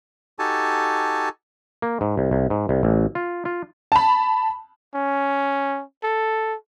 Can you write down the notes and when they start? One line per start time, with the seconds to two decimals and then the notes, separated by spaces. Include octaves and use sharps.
0.39 D#4 F#4 G4 A4 G#5 A5
1.82 A#3
2.01 G#2
2.17 C2
2.31 C2
2.50 G#2
2.69 C2
2.83 A1
3.15 F4
3.45 F4
3.92 A5 B5
4.94 C#4
6.03 A4